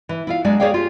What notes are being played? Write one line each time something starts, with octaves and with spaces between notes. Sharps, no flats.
E3
E4 F4 F5
F#3 G#3 D4 D5
G#4 C#5 D5 F5 G5
F4 G4